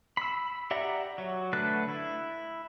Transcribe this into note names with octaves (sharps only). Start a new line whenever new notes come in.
B5 E6
G4 D5 E5 F#5 A#5
F#3
D3 A3 B4 A5 F#6
E4